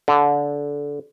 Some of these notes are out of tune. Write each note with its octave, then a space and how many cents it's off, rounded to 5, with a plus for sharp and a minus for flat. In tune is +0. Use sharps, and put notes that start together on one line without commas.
D3 -20